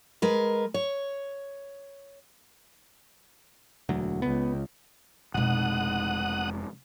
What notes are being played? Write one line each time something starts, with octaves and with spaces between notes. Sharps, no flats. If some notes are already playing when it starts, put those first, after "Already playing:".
G#3 A#4 B4
C#5
E1 D2 F#3
C#2 B3
F1 B2 G#3 D#4 F#5 D#6 F#6